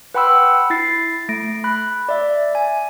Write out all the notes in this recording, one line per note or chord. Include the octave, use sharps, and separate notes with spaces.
B4 F#5 G5 B5 C6 E6
E4 A6 C7
A3 A#6 D7
B5 F#6
D5 E5
G#5